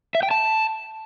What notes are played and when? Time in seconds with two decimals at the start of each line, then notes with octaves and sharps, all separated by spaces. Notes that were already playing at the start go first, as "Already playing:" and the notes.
0.15 E5
0.23 G5
0.31 A5